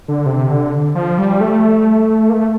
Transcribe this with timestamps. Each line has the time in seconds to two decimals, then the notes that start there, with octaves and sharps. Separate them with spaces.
0.08 D3
0.26 C3
0.49 D3
0.95 F3
1.18 G3
1.41 A3
2.30 A#3
2.34 A3